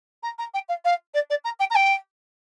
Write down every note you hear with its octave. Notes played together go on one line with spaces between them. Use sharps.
A#5
A#5
G5
F5
F5
D5
D5
A#5
G5
A#5
G5